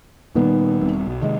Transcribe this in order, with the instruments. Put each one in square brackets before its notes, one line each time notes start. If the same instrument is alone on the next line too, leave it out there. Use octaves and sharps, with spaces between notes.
[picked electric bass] A#2 G3 [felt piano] D#3 B3
[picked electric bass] E1 G3 C4
B1
[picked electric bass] C3 D#3 G#3 [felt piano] D#5